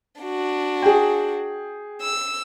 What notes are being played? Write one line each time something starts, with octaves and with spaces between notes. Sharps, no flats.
D4 F#4
G#4 G5
E6